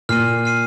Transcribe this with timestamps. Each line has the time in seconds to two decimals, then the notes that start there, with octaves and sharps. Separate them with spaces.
0.09 A#2 F6 C7 D#7
0.45 F6 C7 D#7